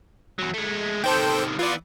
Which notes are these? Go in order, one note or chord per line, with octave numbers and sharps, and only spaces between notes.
E2 F#3
G#3 A3
C3 D#3 A4 C5 G5
E3 B3 F4 D5